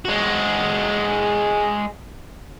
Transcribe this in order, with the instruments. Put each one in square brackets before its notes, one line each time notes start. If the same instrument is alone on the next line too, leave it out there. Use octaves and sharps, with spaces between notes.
[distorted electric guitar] G#3 F#4